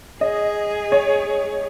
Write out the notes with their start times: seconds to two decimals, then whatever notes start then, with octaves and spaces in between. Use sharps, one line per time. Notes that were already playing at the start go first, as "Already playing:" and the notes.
0.21 G#4 D#5
0.92 C#5